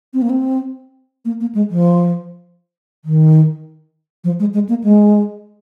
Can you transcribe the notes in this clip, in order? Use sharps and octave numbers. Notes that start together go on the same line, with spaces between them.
C4
A#3
C4
A#3
A#3
G#3
F3
D#3
F3
G#3
G#3
A#3
G#3